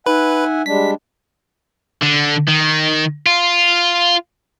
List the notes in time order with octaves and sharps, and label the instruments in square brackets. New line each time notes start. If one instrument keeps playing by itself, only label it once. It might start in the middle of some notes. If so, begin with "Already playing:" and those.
[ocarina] D#4 [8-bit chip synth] B4 [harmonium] E5 F#5 G#5
[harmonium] G3 G#3 D4 [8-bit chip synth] B6
[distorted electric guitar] D3
D#3
F4